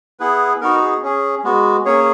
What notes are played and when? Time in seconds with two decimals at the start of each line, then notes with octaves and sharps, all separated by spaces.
0.20 B3 E4 G#4 B4
0.61 B3 D#4 F#4 A#4
0.82 G#4
1.02 C#4 G#4
1.44 G#3 B3 F#4
1.85 A#3 C#4 G#4 C#5